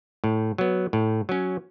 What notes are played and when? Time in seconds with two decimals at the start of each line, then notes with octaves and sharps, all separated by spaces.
0.24 A2
0.58 F#3 B3
0.93 A2
1.29 F#3 C#4